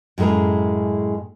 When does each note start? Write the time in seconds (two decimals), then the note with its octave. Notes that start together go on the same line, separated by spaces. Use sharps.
0.18 F#2 A2 G#3 G#4 A#4